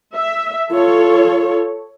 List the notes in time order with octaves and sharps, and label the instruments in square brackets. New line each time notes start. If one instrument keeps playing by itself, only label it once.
[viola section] E5
[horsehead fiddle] F4 [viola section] A4 C#5